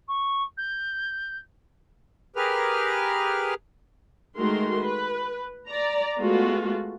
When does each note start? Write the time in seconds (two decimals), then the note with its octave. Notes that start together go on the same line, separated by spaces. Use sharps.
0.08 C#6
0.57 G6
2.36 G4 G#4 A#4 B4 F6
4.37 D#3 G#3 A3 F#4 A#4 C6
4.80 B4
5.67 D5 A#5
6.18 G#3 A3 B3 F4 F#4